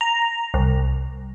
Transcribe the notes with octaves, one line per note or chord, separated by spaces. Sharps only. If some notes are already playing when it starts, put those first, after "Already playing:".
A#5
C2